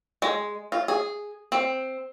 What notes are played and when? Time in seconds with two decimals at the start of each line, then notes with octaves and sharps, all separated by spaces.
0.22 G#3
0.72 F4
0.88 G#4
1.52 C4